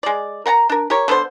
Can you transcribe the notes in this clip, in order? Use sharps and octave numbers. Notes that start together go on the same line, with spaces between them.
G#3 D5
A#4 F#5 A5 A#5
D4 A#4
G4 A#4 C#5
D3 B3 A4 C5